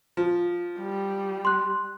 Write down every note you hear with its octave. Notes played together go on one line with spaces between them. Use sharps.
F3
G3
C6 F#6